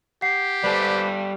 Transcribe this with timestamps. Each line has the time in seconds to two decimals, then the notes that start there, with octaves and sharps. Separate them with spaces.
0.22 G4 F#5 C7
0.64 G3 A4 B4 C5 D5